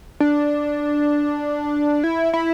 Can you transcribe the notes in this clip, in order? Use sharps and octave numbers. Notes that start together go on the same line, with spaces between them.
D4
E4
E4